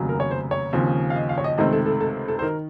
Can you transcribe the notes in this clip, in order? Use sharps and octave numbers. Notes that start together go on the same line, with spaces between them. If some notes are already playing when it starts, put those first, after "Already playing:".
Already playing: F1 D#2 C#3 F#3
A#4
C#5
C5
C#5
D#2 C#3 F3 C4
F5
D#5
F5
C#5
D#5
C#2 C3 D#3 A3 C4 D#5
A4
A4
A4
A4
C5
D#3 A#4